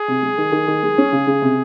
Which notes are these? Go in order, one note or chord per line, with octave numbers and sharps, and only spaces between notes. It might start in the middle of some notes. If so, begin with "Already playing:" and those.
Already playing: G#4
C3
G#3
D#3
D#3
D#3
G#3
C#4
C#3
C#3
C3